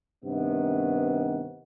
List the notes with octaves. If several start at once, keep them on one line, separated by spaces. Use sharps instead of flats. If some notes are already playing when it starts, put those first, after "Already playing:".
G2 C3 D#3 B3